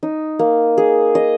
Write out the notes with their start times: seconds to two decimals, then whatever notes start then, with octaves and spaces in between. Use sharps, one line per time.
0.03 D#4
0.39 A#3
0.77 G#4
1.15 D#5